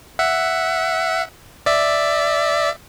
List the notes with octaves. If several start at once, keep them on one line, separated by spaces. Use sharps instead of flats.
E5 F#5
D5 E5